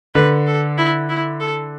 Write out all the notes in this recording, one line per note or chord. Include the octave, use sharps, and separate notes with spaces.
D3 B4
A4
E4
E4
A4